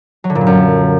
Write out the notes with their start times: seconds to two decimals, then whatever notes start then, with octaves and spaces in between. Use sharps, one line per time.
0.24 F#3
0.30 D3
0.35 A#2
0.41 G2
0.47 F#2